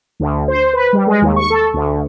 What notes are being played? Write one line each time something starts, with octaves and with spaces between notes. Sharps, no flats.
D2
C5
B4
G3
G#3
D#2
C#6
A4
D2